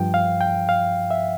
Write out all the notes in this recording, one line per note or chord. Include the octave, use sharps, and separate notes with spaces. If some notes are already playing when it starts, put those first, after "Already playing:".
Already playing: G2 F3 G5
F5
G5
F5
E5